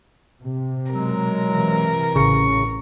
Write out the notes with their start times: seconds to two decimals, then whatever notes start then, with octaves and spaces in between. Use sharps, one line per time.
0.42 C3
0.92 B2 F#3 G#3 A#4
1.48 C3 E3
2.16 A1 C#3 C#6